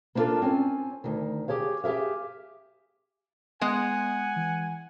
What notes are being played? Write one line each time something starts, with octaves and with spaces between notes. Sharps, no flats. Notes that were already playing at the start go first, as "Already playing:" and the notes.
A#3 B3 D4 D#4 F4 A4
C4 C#4 G#5
D2 D#3
G4 G#4 C#5 F5
G4 G#4 A#4 E5 F5
G#3 B3 D#5 F#5 G#5
E3